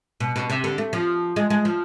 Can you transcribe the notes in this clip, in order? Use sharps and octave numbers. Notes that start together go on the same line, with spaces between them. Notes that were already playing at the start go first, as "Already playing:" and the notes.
B2
B2
C3
D3
A3
F3
G#3
G#3
F3